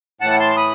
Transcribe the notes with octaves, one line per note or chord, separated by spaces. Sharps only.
A2 E3 F#5 A5
A5 C6
B5 D#6